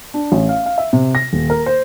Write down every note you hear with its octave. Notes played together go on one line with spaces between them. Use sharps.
D4
A1
F5
F5
E5
C3
A#6
D#1
A#4
C5